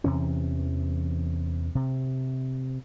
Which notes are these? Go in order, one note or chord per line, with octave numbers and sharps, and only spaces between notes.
E2 C3 E3 C#4
C3